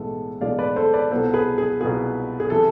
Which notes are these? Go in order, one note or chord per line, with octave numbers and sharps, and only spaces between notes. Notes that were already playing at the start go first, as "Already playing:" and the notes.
Already playing: B1 A2 E3 G#3 B3 A4
B1 A2 E3 G#3 B3 D5 F5
B4 D5
A4 C5
B4 D5
C2 B2 B3 F4 A4 C5
G#4 B4
G#4
C2 B2 B3 F4 G#4
G#4
C3 E3 A4